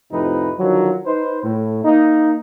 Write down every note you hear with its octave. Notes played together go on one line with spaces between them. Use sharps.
F2 A2 C3 F3 D#4 B4
D3 D#3 F3 F#3
D#4 B4 C5
A2
A#3 D#4